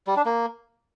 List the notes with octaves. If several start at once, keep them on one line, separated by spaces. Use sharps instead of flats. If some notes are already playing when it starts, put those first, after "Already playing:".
G3
D4
A#3